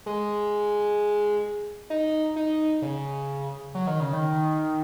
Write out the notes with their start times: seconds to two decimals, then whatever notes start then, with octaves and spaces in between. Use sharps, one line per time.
0.06 G#3
1.90 D#4
2.36 D#4
2.82 C#3
3.75 F#3
3.87 D#3
4.00 C#3
4.13 D#3